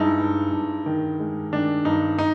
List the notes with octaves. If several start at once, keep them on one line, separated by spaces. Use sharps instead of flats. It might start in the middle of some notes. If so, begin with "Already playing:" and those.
Already playing: G2 G#3 D#4 E4
G2
G2
D#3
G#3
D#3 D4
G2 D#4
D#4